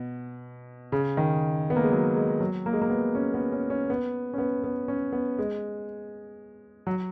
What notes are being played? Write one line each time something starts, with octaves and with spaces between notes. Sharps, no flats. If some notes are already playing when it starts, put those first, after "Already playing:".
Already playing: B2
C#3
D#3
B3
A#3
G#3
F#3
G#3
F#3
A#3
G#3
A#3
B3
C#4
B3
C#4
C#4
B3
C#4
B3
B3
C#4
B3
G#3
F#3